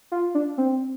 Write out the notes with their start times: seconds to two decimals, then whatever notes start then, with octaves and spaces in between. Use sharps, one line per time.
0.12 F4
0.35 D4
0.58 C4